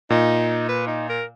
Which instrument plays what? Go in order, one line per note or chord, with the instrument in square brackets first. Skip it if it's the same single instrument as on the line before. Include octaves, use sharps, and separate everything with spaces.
[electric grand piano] A#2 [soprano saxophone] D#4
[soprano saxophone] B4
D#4
A#4